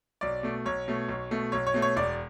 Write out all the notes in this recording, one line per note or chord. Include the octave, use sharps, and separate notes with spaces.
B1 D5
B2 A3
B1 C#5
B2 A3
B1
B2 A3
B1 C#5
C#5
B2 A3
C#5
E1 D5